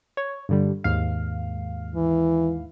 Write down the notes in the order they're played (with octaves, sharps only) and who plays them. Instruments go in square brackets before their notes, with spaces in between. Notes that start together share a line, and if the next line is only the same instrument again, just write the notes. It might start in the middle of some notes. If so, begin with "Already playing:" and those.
[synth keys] C#5
G2 D3 G3
D#2 G#2 F5
[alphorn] E3